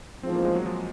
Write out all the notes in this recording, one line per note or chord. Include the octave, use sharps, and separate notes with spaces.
A1 G#2 F3 C4
A#3
G#3
F#3
F3